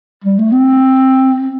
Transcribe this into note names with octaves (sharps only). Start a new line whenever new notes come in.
G3
A3
C4